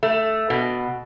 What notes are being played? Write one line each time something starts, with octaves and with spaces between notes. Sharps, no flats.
A3
B2